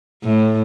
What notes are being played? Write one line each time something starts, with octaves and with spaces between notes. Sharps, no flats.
A2